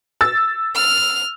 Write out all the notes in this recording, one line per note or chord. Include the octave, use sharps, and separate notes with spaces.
E6 A6
F6